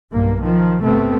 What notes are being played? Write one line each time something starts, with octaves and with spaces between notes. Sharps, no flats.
B1 G2 A#3
D#3 F3
G1 C3 A3 B3 C4